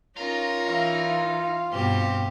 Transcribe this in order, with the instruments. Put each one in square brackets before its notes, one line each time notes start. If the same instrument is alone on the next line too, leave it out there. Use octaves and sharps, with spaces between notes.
[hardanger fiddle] C#4 A#4 [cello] D#4 [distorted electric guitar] F4
[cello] E3 D#4 [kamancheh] F5
[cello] G2 B2 [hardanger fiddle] C4 G4